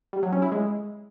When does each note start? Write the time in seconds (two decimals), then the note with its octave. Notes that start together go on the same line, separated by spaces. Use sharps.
0.13 G3
0.23 F#3
0.32 C#4
0.42 E4
0.52 G#3